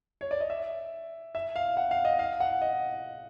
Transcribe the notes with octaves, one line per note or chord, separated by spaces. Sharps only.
C#5
D5
D#5
E5
E5
F5
F#5
F5
D#5
F5
F#5
D#5